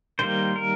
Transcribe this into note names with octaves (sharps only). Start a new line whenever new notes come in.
D#3 G3 A#3 C5
A#4